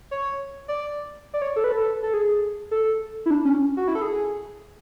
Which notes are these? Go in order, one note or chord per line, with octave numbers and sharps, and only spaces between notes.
C#5
D5
D5
C#5
A4
B4
A4
A4
G#4
A4
E4
D4
C#4
F#4
E4
A4
G#4